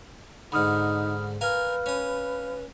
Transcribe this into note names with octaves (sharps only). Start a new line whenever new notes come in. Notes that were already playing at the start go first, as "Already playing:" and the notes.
G#2 D3 D#4 B5 D#6 F6
A#4 B4 F5 G#5 F6
C#4 D#6